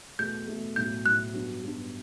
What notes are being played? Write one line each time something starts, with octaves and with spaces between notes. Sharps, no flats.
E2 B2 A3 G6
E2 B2 A3
B1 A2 F#3 G6
B1 A2 F#3 F#6
G2 F#3 B3
G2 F#3 B3